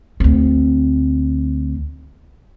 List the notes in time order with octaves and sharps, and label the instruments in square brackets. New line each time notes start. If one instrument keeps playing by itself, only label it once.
[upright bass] D2 C4